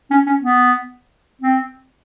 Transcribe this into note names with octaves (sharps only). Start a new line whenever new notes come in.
C#4
C#4
B3
C4